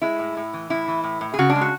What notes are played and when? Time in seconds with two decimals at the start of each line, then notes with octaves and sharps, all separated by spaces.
0.02 G#3 E4
0.19 A2
0.37 A2
0.53 E3
0.70 A2 E4
0.88 E3
1.04 A2
1.21 A2
1.34 G#4
1.39 C#3 F#4
1.50 D4
1.56 G#3
1.61 F#4